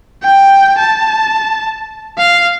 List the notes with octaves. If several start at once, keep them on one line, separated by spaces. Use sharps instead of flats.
G5
A5
F5